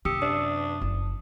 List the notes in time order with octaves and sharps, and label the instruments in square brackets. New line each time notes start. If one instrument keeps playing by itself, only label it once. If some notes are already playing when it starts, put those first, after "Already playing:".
[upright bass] F#2 C3 [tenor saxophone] G4 [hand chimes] D#6 E6 C#7
[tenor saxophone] D4 [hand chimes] D#6
[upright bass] F#1 F3